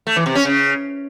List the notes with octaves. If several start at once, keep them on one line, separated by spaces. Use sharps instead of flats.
A3
E3
C3
C#4
C#3